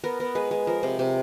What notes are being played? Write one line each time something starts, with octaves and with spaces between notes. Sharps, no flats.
B3 A#4
B3
G#3 B4
G#3
F3 A#4
C3
C3